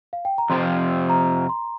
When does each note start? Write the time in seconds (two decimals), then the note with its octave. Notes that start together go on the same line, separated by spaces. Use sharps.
0.13 F5
0.25 G5
0.38 A#5
0.50 F2 C3 F3 C4 C6
1.10 A#5
1.49 C6